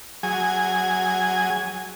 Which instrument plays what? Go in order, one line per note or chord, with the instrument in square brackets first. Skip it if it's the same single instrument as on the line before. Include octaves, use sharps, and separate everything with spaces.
[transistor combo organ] F#3 G#4 G#5